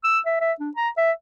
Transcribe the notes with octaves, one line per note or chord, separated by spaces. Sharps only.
E6
E5
E5
D4
A#5
E5